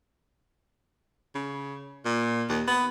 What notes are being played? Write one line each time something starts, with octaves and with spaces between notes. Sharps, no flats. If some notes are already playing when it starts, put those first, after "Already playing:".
C#3
A#2
D#2
B3